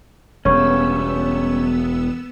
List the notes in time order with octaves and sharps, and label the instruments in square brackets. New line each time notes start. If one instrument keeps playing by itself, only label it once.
[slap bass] E1 [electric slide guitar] G3 C#4 [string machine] B3 E6 [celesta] C#5 C#6